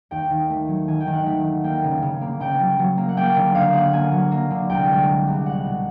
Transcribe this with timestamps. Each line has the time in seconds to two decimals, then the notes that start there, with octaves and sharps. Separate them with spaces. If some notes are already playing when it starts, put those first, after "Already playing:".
0.11 D#2 G5
0.30 D#3
0.50 A3
0.68 F#3
0.88 D#3 G#5
1.00 G5
1.07 D#3
1.13 F#5
1.26 A3
1.44 D#3
1.64 A#3 G5
1.84 C#3
2.02 C#3
2.21 A#3
2.40 C#3 G5
2.59 F#3
2.79 F#3
2.97 A#3
3.09 F#5
3.17 A#3 G5
3.36 D3
3.55 A#3 F5
3.74 A#3 F#5
3.93 A#3 G#5
4.12 F#3
4.31 A#3
4.51 D3
4.70 C2 G5
4.89 G#3
5.08 C2
5.27 C2
5.46 G#3 F#5
5.65 B2